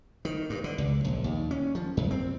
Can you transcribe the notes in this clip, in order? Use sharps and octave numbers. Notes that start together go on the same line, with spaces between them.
D#3
G2
D3
C#2
A#1
D#2
C#4
F3
F#2
C4